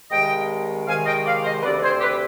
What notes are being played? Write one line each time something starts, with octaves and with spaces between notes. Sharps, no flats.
C2 C3 D#3 G#3 D#5 G5
C2 C3 D#3 G#3 F5 G#5
D#5 G5
D5 F5
C5 D#5
D2 C3 G3 C4 B4 D5
G#4 C5
G4 B4